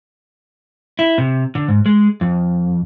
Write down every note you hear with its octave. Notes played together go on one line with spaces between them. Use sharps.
E4
C3
D3
G#2
G#3
F2